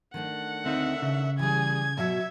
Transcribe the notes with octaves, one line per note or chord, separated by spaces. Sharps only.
D#3 A3 D4 F#5
D2 C4 D#4 E5
C#3
E3 G3 G#4 G#6
B2 F#3 F#4 E5